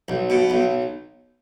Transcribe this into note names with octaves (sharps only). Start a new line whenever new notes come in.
B1
B2
B1